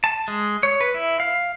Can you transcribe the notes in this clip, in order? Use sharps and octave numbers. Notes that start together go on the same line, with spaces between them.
A5
G#3
C#5
B4
E4
F5